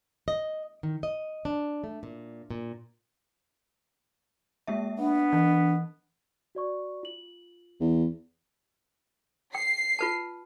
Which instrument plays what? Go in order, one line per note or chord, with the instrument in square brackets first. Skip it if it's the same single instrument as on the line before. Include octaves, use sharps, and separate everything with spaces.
[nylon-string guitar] D#5
D#3
D#5
D4
A3
A#2
A#2
[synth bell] G#3 A#3 E5
[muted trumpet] B3 [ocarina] D4
[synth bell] E3
[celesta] F#4 D5 C#6
F4 F#7
[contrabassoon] E2
[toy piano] G5 [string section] C7
[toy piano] F4 B4 A5